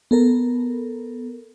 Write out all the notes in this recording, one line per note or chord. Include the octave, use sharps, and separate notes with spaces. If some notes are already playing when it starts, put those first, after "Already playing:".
B3 A4 A#4